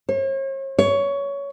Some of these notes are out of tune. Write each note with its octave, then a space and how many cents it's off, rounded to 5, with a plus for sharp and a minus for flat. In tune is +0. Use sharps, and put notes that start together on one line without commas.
C#5 -45
C#5 +15